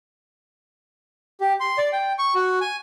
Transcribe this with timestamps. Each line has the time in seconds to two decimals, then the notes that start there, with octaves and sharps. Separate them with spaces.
1.41 G4
1.60 C6
1.78 D5
1.92 G5
2.19 C#6
2.35 F#4
2.61 G#5